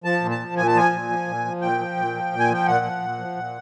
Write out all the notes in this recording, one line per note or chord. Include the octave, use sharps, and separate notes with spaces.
F3 A5
A#2
A5
F3
A#2 G#5
A5
F3 G#5
A#2
F3
A#2
F3
A#2 G5
F3
A#2
F3
A#2
G#5
F3 G5
A#2 F#5
F3
A#2
F3
A#2